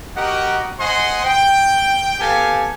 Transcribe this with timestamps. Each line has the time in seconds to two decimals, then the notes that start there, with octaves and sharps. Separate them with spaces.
0.17 F#4 G4 A#4 D#5 F#5
0.80 C5 D#5 F#5 G#5 C6
1.25 G5
2.20 B3 G4 A4 F5 G#5